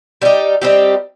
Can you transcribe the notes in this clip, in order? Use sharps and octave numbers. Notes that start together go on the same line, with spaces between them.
G3 C4 D#4 G4
G3 C4 D#4 G4